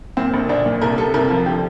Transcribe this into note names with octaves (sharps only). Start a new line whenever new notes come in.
A#2 C4
A#1
A#1 D4
A#2
C2 A#4
C3 A4
C2 A#4
F3
D3 G4